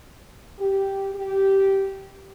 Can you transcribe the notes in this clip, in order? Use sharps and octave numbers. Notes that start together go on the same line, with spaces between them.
G4
G4